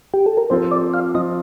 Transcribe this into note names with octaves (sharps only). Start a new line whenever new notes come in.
G4
A4
A#4
F3 C4 F4 C5
D5
F5
F3 C4 F4 D#5